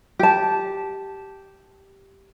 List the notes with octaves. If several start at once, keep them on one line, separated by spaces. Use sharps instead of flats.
G4 A5